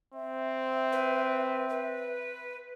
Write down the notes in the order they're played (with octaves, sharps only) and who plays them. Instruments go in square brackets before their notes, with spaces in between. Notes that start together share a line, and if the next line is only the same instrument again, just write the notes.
[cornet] C4 [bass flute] E5
[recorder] B4
B4